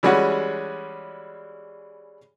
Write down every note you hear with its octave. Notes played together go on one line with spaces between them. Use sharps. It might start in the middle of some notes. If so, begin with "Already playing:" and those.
E3 G3 G#3 C#4 F#4